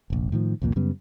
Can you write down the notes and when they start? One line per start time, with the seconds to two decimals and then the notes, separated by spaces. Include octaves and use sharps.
0.10 F1 A#1
0.32 A2 D#3 F3
0.62 C2 F2 A#2 A#3
0.76 F#2 C#3 G3 B3